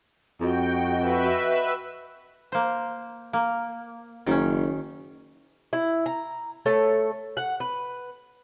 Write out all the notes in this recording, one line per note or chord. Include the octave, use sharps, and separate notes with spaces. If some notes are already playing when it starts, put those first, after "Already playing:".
F2 F#4 D#5 G5
B4 E5
A#3 C5
A#3
F#1 D#3 C#4
E4
A#5
A3 A4 C#5
F#5
B4